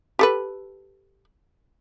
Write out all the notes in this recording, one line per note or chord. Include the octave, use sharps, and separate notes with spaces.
G4 A4 B4